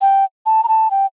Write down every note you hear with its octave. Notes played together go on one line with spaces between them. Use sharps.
G5
A5
A#5
A5
G5